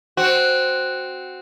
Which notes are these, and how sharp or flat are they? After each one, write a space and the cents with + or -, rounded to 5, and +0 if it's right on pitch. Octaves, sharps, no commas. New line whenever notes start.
C4 +0 F#4 +0